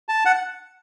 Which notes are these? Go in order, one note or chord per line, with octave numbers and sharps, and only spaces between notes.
A5
F#5